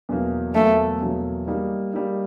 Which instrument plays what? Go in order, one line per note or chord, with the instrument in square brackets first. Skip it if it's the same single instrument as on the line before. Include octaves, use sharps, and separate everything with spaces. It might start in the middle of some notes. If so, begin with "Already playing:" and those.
[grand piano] E2 B2 F#3 A#3
[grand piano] E2 B2 F#3 A#3 [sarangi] A3
[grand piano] E2 B2 F#3 A#3
G3 A#3 D#4
G3 A#3 D#4